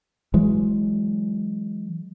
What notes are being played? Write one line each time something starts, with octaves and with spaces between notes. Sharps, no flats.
E3 F#3 G#3